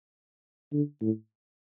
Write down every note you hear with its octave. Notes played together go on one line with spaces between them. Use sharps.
D3
A2